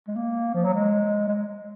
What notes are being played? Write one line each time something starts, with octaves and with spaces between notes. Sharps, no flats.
G#3
A#3
F3
F#3
G#3
G#3